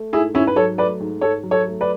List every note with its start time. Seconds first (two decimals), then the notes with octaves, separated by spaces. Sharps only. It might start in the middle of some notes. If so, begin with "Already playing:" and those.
Already playing: A3
0.13 G#2 E4 G#4
0.34 G#2 C#4 E4
0.47 B4
0.56 F#3 A4 C#5
0.78 A3 B4 D5
1.00 G#2
1.21 G#2 A4 C#5
1.43 F#3
1.51 A4 C#5
1.66 A3
1.81 B4 D5